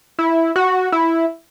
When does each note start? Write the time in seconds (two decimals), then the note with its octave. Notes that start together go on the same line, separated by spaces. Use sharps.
0.19 E4
0.56 F#4
0.92 E4